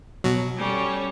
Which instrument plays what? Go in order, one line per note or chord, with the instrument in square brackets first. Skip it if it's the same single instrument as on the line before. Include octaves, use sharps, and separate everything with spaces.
[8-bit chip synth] B2 F#3
[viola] G3 [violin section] C#4 A4 C#5